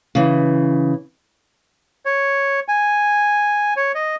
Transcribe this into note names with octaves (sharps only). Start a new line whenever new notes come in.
C#3 E3
C#5
G#5
C#5
D#5